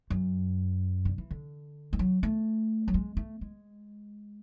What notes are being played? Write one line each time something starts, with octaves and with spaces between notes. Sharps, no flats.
F#2
D3
E3
D3
G#3
F#3
A3
F#3
G#3
A3
G#3